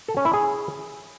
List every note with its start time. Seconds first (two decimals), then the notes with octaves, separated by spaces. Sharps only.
0.08 A4
0.17 C#4
0.25 E4
0.34 G#4